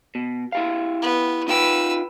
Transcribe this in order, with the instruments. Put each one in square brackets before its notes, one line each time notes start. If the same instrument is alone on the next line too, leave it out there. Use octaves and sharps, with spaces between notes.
[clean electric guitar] B2
E4 G4 F5
[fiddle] B3
[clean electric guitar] D#4 F4 G5 [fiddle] B4 E6